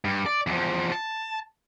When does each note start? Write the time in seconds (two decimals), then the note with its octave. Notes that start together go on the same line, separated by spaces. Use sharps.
0.05 G2
0.26 D5
0.47 E2 F3
0.92 A5